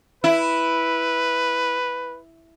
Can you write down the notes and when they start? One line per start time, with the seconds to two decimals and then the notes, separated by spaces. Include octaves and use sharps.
0.24 E4 B4